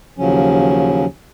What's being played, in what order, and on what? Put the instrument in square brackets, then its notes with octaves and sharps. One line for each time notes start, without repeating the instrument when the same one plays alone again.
[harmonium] D#2 C#3 F3 F#3 C#4